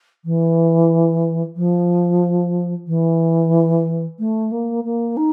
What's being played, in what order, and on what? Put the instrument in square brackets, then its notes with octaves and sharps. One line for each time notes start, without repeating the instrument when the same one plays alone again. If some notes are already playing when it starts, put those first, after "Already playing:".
[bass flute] E3
F3
E3
A3
A#3
A#3
D#4